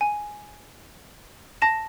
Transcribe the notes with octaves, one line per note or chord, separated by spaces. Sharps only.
G#5
A5 A#6 E7